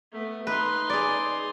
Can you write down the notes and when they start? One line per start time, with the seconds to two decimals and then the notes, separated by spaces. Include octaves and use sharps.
0.12 A3 B3
0.47 D#4 B4 C6
0.90 G#4 D5